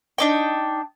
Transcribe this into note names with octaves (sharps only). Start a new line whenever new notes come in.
D4 D#4 G5